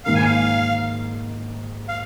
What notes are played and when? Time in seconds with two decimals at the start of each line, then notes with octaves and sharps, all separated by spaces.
0.05 G#2 D#3 A#3 F5
0.15 G#5
0.25 F5
1.88 F5